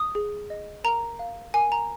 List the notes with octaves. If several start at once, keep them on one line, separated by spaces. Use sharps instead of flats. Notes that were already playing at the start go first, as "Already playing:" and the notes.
Already playing: D#6
G#4
D#5
A#4 A#5
F5
A#4 G#5
A#5